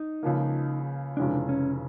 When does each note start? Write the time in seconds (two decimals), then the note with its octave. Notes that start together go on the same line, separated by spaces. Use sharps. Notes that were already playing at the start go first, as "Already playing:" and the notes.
Already playing: D#4
0.23 C#2 C#3 F3 A#3
1.17 F1 F2 C#3 E3 G#3 D4
1.49 C#4